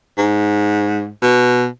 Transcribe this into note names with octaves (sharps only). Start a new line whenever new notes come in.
G#2
B2